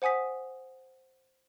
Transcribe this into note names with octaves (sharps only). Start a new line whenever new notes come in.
C5 F#5 G#5 D#6 B6